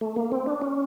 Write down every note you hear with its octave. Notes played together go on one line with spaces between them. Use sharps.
A3
A#3
C4
D4
C#4